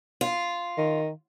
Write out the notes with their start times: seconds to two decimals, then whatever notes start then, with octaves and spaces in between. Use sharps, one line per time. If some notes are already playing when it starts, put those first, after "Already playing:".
0.21 F4
0.77 D#3